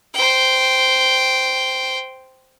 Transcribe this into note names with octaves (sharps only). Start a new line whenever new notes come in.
C5 G5